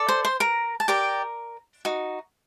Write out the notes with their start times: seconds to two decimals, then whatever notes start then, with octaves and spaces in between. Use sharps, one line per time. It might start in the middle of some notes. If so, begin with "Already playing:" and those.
Already playing: A4 D5
0.08 C5 C6
0.25 C5 C6
0.40 A#4 A#5
0.80 A5
0.88 G4 A#4 D5 A#5
1.85 D#4 F#4